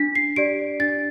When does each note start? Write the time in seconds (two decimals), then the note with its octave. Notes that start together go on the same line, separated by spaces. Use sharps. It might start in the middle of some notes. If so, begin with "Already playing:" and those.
Already playing: D4 B6
0.15 C7
0.36 G4 D5 D7
0.80 D4 A6